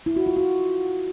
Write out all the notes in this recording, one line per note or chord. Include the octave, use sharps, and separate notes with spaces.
E4
F#4
F4
F#4